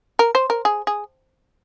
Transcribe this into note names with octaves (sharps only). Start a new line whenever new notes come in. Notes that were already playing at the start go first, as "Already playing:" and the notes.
A#4
C5
A#4
G#4
G#4